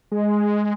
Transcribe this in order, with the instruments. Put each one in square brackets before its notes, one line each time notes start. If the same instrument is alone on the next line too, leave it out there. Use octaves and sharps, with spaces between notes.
[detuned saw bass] G#3